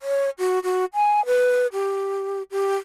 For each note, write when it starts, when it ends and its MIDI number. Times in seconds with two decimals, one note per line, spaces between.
0.01 0.30 73
0.39 0.59 66
0.64 0.85 66
0.95 1.24 80
1.26 1.67 71
1.73 2.43 67
2.52 2.76 67